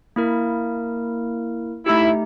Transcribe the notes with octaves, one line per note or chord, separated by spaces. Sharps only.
A#3 E4 A#4
A3 D#4 E4 G4